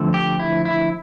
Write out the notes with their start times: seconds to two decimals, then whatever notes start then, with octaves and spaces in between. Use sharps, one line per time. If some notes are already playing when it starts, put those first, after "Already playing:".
Already playing: D3 F3 A3 C4
0.14 G4
0.40 E4
0.65 E4